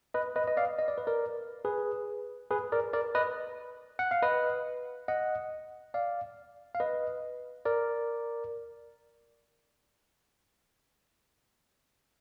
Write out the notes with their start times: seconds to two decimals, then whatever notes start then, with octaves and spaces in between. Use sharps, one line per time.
0.14 B4 D#5
0.36 B4 D#5
0.47 D#5
0.57 D5 F5
0.79 D#5
0.88 D5
0.98 B4
1.07 A#4 D5
1.65 G#4 B4
2.51 G#4 B4
2.72 A#4 D5
2.93 A#4 D5
3.15 B4 D#5
3.99 F#5
4.11 F5
4.22 B4 D#5
5.08 D#5 F#5
5.94 D5 F5
6.75 F5
6.80 B4 D#5
7.65 A#4 D5